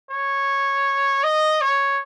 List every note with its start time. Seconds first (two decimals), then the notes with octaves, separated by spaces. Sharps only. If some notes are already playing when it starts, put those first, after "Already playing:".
0.11 C#5
1.24 D#5
1.61 C#5